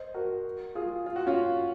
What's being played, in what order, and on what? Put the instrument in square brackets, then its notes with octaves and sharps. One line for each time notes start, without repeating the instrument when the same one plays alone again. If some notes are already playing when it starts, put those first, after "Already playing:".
Already playing: [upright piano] C5 D#5
F#4 A#4
F4 G#4
F4
F#4
C#4 F4